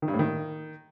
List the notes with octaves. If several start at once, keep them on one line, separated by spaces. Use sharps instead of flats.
D#3
G2
A2
D#3